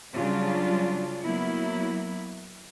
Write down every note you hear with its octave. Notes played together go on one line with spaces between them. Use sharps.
C#3 F#3 G3 D4 F4
F#3 A#3 B3 E4